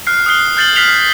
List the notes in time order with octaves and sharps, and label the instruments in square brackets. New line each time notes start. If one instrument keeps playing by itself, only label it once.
[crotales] F6 F#6 C7
D#6 F6 F#6 C7 G7
F6 G6 A6 C7 F#7 G7
F6 F#6 B6 C7 F7 G7